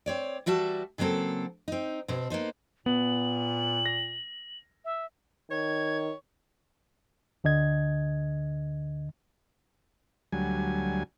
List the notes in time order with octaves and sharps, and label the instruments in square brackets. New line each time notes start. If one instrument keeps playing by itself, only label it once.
[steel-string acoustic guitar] C4 C#5 D5
E3 G3 F#4 E5 A5
C#3 F#3 A#3 C4 A4
C4 D#4
B2 C4
A#3 B3 D#4 C5
[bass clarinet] A#2 [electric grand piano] B3 [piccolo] F#7
[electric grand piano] A#6
[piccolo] E5
[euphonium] D#3 [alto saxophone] C#5 [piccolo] G#6
[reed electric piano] D2 D3 D#5 G#6
[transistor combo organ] D2 F#3 G3 G#5